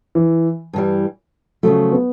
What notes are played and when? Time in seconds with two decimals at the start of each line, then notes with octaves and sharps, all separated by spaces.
0.15 E3
0.73 G2 E3 G3
1.63 C#3 F3 F#3 A3
1.92 B3